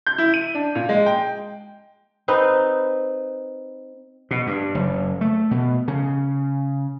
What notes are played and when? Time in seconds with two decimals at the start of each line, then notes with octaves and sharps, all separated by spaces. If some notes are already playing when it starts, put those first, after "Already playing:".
0.06 G6
0.18 E4
0.34 D#7
0.55 D4
0.75 A#2
0.89 G#3
1.06 G5
2.28 C4 D#4 B4
4.31 B2
4.47 G2
4.75 F#1
5.21 A3
5.51 B2
5.88 C#3